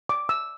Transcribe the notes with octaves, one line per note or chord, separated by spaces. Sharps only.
D6
E6